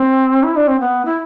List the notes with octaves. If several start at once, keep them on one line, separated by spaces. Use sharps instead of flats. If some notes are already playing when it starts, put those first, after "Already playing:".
Already playing: C4
E4
D4
C4
B3
E4